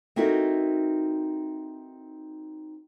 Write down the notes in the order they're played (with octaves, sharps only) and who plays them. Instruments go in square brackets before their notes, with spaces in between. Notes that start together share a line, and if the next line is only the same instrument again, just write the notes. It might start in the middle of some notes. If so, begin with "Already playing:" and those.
[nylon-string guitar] C4 D#4 E4 F#4 A4 A#4